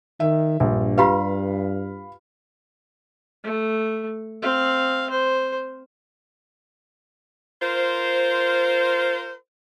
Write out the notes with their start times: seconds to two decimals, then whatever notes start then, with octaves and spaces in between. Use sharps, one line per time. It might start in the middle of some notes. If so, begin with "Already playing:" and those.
0.20 D#3 E5
0.60 A#1 G2
0.98 F4 G4 B4 F5 B5
3.44 A3
4.42 C4 F5
5.10 C5
7.62 F4 A#4 C5